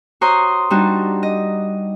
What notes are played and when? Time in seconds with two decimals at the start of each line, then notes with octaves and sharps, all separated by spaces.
0.21 F#4 C5 C#5 A#5 C6 D#6
0.70 G3 D4 D#4 F#4
1.23 D#5